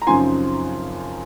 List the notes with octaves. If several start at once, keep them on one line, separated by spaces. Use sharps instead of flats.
A#5
F#2 C#3 F3 C4 D#4 G#5 C6